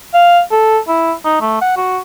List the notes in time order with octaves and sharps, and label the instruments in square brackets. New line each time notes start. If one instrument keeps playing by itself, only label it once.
[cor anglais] F5
A4
E4
D#4
A3
F#5
F#4